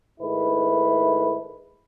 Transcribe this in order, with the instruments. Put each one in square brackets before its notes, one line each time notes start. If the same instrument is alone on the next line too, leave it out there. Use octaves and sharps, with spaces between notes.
[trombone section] G#2 D#3 A3 E4 B4